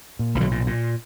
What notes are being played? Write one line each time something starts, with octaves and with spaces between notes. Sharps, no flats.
A#2
B1 E3
D3 F#3
A#2
A#2